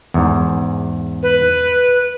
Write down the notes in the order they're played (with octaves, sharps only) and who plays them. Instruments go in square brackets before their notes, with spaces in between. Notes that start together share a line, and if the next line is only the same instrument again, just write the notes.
[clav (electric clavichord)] E2 G#2
[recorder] B4